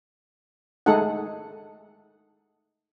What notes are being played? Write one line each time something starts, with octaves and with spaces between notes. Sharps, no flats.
G#3 A3 D#4 G#4 A4 F#5